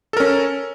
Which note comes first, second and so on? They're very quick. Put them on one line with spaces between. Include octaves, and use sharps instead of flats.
A4 A#4 C#4